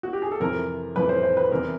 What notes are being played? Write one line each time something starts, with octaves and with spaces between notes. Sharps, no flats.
F#4
G4
G#4
A4
F2 C3 E3 A#4
F2 C3 E3 B4
C5
C5
B4
E2 C3 E3 A#4